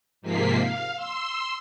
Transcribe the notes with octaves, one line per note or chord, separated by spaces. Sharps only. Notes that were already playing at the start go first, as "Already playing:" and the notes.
G#2 C3 F3 A#3 B6 C7
F5
C6 E6